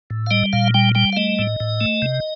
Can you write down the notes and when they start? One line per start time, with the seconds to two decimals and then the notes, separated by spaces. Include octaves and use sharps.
0.10 A2
0.27 F5
0.31 G3 D#5
0.53 A#2 F5
0.74 G3 G5
0.95 G3 G5
1.13 F5
1.17 A3 D#5
1.39 A2
1.60 A2
1.81 A3
2.02 C3